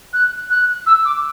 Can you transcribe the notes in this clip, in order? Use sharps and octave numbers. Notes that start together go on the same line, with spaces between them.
F#6
F#6
E6
D6